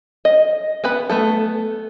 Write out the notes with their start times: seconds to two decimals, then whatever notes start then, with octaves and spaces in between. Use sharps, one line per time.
0.25 D#5
0.84 B3 B4 B5
1.10 A3 B3 A4